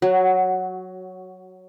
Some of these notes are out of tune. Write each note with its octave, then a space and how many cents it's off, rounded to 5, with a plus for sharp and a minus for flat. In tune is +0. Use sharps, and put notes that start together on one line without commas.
F#3 +0 F#4 +20